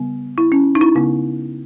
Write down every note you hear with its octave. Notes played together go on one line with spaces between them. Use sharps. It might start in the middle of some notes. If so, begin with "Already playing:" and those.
Already playing: C#3 G3 B3
E4
C#4
D#4
E4
C#3 G#3 B3